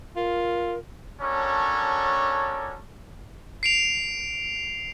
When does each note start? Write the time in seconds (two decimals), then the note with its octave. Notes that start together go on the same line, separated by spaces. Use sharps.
0.16 F4 A#4
1.21 C#4 D4 F#4 A4 A#4 C#5
3.63 C7 D7 F7